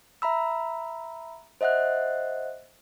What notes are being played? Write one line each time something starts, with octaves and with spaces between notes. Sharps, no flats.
E5 A#5 B5 E6
C5 D#5 E5 F#5 F#6